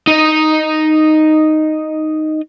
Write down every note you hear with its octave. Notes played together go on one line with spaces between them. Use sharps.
D#4 D#5